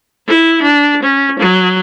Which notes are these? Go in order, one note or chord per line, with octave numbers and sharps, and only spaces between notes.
E4
D4
C#4
F#3